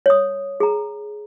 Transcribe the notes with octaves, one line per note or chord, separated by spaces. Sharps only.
C#5 D#6
G#4 A#5